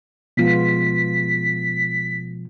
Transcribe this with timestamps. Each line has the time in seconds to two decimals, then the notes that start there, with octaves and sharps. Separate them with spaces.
0.37 B2 F3 G#3 B3 F4 B6